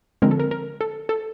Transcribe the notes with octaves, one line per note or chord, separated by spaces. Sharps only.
D3 F3 G#3 C4 A#4
A4
A#4
A#4
A4
A4